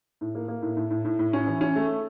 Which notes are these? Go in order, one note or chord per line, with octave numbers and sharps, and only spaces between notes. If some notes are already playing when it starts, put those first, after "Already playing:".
A2
A#3
A#3
A2
A2
A2
A2
A2
C#4
E3
C#4
A3